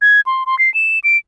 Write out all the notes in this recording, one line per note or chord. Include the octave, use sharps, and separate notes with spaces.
G#6
C6
C6
C7
E7
D7